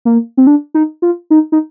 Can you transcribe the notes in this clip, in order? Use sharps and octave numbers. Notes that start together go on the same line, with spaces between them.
A#3
C4
D4
D#4
F4
D#4
D#4